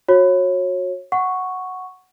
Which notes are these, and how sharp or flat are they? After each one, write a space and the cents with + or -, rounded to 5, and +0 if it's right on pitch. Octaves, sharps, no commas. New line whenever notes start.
F#4 -20 C#5 -25
F#5 +0 C#6 +0